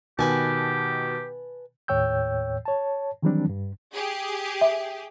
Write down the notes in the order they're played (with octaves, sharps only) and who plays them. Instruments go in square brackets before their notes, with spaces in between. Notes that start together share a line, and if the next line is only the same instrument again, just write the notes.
[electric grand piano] B2 D#3 [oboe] G4 [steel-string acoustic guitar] B4 G#5 A5
[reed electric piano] D#2 A2 C#5 G5 E6 G6
C#5 A5
D#3 E3 F#3 G3 C4 D4
G2
[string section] G4 G#4
[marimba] E5